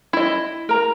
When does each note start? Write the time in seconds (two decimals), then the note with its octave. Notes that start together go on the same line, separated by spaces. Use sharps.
0.13 E4 D#5
0.69 A#4 A#5